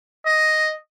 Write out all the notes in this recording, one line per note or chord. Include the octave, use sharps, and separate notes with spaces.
D#5